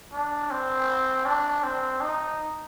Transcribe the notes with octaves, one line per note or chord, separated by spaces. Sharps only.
D4
C4
D4
C4
D#4